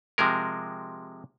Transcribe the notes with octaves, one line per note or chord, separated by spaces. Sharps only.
C3 F3 G#3 A#4